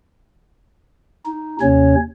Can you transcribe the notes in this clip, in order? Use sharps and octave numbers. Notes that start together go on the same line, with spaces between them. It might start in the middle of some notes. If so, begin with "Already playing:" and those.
D#4
D#2 C3 C#4 C#5